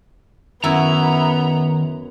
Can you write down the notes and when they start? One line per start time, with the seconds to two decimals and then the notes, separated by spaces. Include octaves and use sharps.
0.64 F#2 D#3 B3 E4 A#5